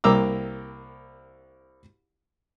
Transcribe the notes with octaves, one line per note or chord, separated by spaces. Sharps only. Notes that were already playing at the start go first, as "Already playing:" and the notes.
C2 A#3 G5 A#5 D6 E6